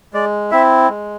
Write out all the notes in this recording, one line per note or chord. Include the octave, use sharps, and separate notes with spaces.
G#3 D5
C4 E4 E5
G#3